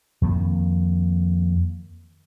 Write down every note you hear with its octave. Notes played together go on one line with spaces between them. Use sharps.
F2 D#3 A#3